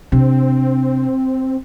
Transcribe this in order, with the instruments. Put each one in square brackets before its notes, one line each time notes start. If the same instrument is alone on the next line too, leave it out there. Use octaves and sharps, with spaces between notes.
[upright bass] C3 D4 [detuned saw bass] C4